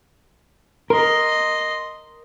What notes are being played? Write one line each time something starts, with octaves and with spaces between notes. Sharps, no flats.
A#4 D#5 C6